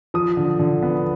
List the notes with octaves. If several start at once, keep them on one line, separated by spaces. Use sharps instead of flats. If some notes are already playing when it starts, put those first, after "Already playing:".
F3 D#6
D3
D3
B3